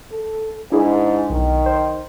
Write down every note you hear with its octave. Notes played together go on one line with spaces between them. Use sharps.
A4
G#2 D4 E4 G#4
B1 D#3
C5